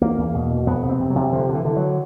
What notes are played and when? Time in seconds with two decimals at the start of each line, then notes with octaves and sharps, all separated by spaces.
0.01 E2 A#3
0.18 E2
0.34 B2
0.50 B2
0.67 F2 B3
0.83 C3
0.89 C4
1.00 C3
1.10 F#3
1.16 C3
1.33 D3 F3
1.49 D3
1.55 E3
1.65 D3
1.76 F#3